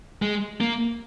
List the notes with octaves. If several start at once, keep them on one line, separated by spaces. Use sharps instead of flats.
G#3
A#3